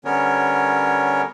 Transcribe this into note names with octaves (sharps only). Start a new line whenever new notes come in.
D3 G3 B3 C#4 A#4 C#5